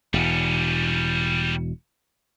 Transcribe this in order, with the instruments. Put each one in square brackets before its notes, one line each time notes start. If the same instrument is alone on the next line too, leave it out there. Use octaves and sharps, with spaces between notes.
[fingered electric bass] E1 [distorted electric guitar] G3 C#4